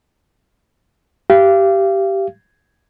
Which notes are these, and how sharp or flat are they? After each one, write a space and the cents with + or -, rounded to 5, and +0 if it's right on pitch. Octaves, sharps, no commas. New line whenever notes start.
G4 -10 F5 -35